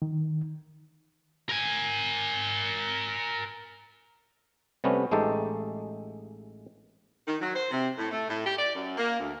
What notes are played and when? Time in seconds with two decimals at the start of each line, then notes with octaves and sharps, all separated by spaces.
0.02 D#3
1.49 A#4 G#5
4.84 C3 G3 A3 B3 C#4
5.11 A1 G#3 A3 D#4 G4 A4
7.27 D#3
7.41 F#3
7.53 C5
7.71 C3
7.98 A2
8.11 A3
8.29 A2
8.46 G4
8.58 D5
8.75 F#2
8.97 A#3
9.20 D2